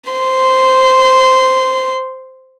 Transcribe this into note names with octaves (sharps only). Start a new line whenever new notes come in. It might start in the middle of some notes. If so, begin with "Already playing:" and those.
C5 C6